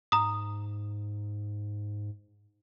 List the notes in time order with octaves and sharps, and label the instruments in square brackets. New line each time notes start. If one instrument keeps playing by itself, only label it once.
[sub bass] G#2 [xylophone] A#5 D#6